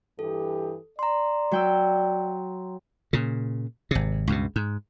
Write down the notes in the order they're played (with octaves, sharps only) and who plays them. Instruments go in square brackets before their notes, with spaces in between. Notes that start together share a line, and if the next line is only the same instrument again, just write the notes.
[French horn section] G2 E3 G4 [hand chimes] A4
[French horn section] D5 [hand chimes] A#5 C6
[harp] F#3 G5 E6
[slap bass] A#2 C#3
G#1 C3
C#2 G2 B2
G#2